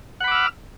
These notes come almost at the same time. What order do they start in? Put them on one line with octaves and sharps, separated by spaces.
F#5 B5 D6 E6 F6